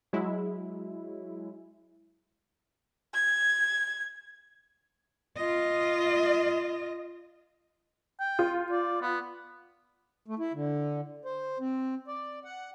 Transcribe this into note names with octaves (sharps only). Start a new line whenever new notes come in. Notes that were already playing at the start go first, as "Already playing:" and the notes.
F#3 G#3 E4
G#6
F4 D#5
G5
F4
D5
B3
A3
E4
D3
C5
C4
D5
F#5